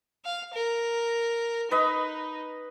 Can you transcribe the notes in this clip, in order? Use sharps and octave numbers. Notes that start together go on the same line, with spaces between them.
F5
A#4
D#4 B4 D#5